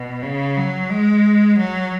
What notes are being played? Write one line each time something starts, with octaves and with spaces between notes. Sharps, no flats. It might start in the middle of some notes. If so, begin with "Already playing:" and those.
Already playing: B2
C#3
F#3
G#3
F#3